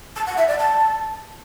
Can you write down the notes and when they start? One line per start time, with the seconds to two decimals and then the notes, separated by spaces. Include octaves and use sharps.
0.16 A5
0.27 F#5
0.37 E5
0.48 D5
0.59 A5